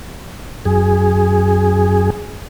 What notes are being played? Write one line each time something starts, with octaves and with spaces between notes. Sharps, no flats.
F#2 G#4